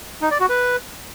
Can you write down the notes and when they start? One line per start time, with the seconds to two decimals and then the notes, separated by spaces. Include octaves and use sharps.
0.22 D#4
0.31 D5
0.40 F#4
0.49 B4